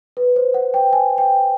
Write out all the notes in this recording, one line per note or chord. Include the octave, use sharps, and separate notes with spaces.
B4
C5
F#5
G5
G#5
G5